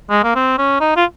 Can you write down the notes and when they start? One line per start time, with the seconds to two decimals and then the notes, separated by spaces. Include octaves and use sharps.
0.10 G#3
0.24 A#3
0.35 C4
0.58 C#4
0.80 D#4
0.96 F4